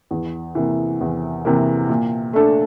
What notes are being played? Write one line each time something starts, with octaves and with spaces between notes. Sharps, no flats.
E2
C3 E3 A#3
E2
C3 E3 A#3
A#2
A3 D4 A4